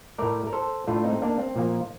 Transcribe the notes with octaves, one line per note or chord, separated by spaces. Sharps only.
A2 A3 A#4 D5
A#4
A4 C5
A2 A3 D4 F4
C4 D#4
A#3 D4
C4
A#2 F3 A#3